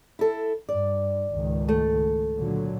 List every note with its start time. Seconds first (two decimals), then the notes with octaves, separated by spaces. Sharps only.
0.19 E4 A4
0.69 G2 D5
1.31 C#2 G#2 D#3
1.68 A3
2.39 A#2 D3 F#3